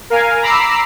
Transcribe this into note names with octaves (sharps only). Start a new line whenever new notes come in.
A#4 F5 G#5
A#5 B5 D6 E6 C7